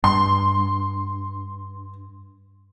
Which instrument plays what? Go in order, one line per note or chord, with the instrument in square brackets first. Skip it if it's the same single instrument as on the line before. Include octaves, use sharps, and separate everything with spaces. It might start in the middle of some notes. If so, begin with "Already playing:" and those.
[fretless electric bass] G2 [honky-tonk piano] C6